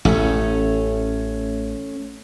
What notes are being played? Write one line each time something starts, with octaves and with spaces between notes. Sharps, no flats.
A1 A3 C#4 C#5